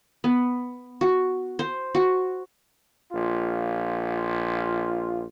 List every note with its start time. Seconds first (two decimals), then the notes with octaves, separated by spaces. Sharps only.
0.24 B3
1.01 F#4
1.59 C5
1.95 F#4
3.12 A#1 F4